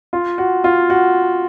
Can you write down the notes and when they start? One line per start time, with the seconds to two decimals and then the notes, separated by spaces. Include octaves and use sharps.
0.13 F4
0.38 F#4
0.64 F4
0.90 F#4